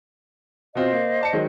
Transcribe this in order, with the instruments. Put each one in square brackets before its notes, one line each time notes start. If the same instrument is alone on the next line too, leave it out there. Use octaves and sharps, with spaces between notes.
[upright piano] B2 C4 F4 [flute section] C5 D#5
[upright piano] A#3
D5 A5 C#7
D#3 F#3 G#3